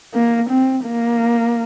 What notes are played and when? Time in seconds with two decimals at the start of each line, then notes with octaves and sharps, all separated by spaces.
0.14 A#3
0.49 C4
0.85 A#3